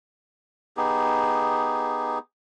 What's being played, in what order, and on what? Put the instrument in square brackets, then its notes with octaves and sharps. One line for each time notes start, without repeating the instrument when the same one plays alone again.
[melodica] B3 D#4 G4 G#4